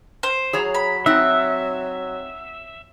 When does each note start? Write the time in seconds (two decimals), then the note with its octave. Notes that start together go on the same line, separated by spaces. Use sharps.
0.23 C5
0.53 F#3 G#4 C#5 A#5
0.75 B5
1.06 C4 D#4 E5 F#5